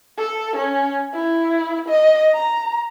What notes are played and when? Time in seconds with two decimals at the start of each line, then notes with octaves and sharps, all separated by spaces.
0.18 A4
0.57 C#4
1.14 E4
1.89 D#5
2.34 A#5